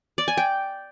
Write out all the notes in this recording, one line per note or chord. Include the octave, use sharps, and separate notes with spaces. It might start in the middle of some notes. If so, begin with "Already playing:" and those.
D5
G#5
G5